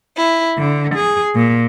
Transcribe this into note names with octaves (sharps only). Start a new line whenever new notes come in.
E4
D3
G#4
A#2